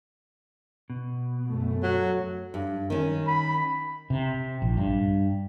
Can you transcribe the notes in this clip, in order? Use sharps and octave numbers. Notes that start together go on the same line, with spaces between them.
B2
F#2 A3
F#3
G2
D#3 C#4
B5
C3
A#1
G2